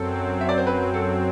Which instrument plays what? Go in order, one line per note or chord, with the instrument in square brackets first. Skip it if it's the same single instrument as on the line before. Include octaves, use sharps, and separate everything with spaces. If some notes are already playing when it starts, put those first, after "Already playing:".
Already playing: [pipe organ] F#2 F#3 C4 [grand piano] A4
[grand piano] E5
D5
C5
B4
A4